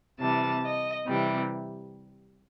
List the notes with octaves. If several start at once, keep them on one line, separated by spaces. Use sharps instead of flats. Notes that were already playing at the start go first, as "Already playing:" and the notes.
C3 E3 G3 A5
D#5
C3 E3 G3